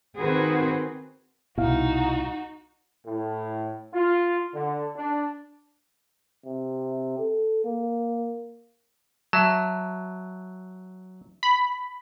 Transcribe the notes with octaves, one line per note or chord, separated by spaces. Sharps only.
D#3 C4 F#4 G#4 B4 C5
C2 B2 D#4 E4 F#4 F5
A2
F4
D3
D4
C3
A4
A#3
F#3 E5 A5
B5